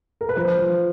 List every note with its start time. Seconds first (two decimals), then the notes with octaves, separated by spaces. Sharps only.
0.21 A#4
0.29 B4
0.36 F3 C5
0.58 F3